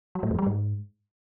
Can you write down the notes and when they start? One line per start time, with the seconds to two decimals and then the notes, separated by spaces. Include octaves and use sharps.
0.15 F#3
0.23 A2
0.31 F2
0.39 G3
0.46 G#2